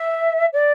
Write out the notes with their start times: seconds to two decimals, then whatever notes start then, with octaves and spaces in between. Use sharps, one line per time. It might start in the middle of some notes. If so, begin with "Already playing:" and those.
Already playing: E5
0.53 D5